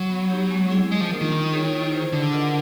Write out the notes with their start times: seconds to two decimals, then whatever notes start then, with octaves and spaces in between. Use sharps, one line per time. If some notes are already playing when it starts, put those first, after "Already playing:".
Already playing: F#3
0.10 B3
0.30 D#4 G4
0.51 G#3
0.70 C4 E4 G#4
0.90 G3 G#3
1.01 F3
1.11 A#3 D4 F4 A#4
1.21 D#3
1.32 F4
1.52 G#4 C#5
1.73 E4
1.92 G#4 C5
2.12 D3 D4
2.33 F4 A#4 D#5 F#5